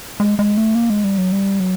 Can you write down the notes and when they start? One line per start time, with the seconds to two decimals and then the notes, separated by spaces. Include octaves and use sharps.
0.20 G#3
0.39 G#3
0.58 A3
0.75 A#3
0.90 G#3
1.04 G3
1.18 F#3
1.32 G3
1.60 F#3